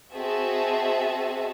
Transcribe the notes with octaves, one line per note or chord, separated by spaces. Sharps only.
C4 F#4 G#4 D#5 E5 A5